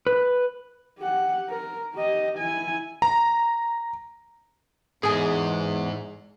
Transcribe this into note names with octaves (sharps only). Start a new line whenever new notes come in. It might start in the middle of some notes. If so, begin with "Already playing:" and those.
B4
G4 F#5
A#4
G4 D#5
E4 G#5
A#5
E2 G#2 G#4 G#5